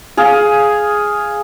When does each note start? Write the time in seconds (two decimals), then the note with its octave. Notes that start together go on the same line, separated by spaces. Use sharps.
0.17 G#4 F5